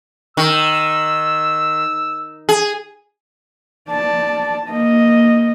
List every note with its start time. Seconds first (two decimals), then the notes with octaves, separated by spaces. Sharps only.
0.37 D#3 E6
2.49 G#4
3.90 D5 A5
4.67 A#3 D#5